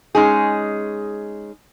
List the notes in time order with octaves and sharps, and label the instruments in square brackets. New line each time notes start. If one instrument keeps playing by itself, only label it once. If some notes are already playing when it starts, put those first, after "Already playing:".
[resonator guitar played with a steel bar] G#3 C#4 D#4 G#4